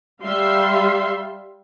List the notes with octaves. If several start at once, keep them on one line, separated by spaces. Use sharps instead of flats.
G3 E5 F5 C6